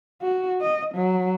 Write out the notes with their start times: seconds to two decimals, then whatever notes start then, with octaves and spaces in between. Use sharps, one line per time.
0.22 F#4
0.61 D#5
0.95 F#3